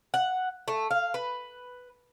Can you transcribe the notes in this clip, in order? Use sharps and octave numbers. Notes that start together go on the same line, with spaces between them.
F#5
A3
F5
B4